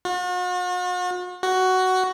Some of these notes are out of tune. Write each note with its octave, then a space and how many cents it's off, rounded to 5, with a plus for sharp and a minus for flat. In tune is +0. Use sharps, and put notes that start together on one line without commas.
F#4 -45
F#4 +10